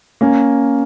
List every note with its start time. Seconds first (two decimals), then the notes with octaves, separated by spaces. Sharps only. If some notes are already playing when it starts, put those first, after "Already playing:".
0.21 A#3 C#4